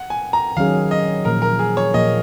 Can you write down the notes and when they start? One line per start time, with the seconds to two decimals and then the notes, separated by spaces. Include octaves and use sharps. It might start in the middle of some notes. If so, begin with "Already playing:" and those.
Already playing: F#5
0.10 G#5
0.33 A#5
0.57 D#3 F#3 C#4 G#4 F5
0.91 D#5
1.25 A#2 F3 A#3 A#4
1.42 A#4
1.59 G#4
1.77 C#5
1.94 A#2 F3 A#3 D#5